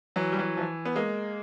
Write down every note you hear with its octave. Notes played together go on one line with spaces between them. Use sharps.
E3 F#3
G3
E3 F#3
F3
E3
B3
G#3 A#3